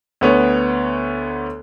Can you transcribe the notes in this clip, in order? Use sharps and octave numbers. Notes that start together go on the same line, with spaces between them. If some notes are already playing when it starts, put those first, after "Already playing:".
D2 B3 C#5